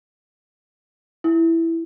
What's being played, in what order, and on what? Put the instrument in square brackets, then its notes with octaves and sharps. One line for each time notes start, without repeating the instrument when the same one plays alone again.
[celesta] E4